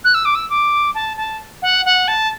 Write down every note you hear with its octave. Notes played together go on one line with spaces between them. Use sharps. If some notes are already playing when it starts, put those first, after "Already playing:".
F#6
E6
D6
E6
D6
A5
A5
F#5
F#5
A5